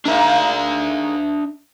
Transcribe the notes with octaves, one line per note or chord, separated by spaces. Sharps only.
G#3 A#3 D4 D#4 E5